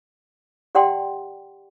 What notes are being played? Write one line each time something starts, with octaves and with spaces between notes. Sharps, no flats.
G4 D5 F#5 G5 A5 C6